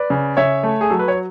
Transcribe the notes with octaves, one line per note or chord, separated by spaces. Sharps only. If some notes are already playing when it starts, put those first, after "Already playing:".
Already playing: B4 D5
C#3
C#3 C#5 E5
A3
G#4
F#3 A4
B4
C#5